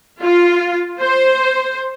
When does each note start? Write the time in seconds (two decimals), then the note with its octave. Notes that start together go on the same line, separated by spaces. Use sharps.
0.21 F4
1.00 C5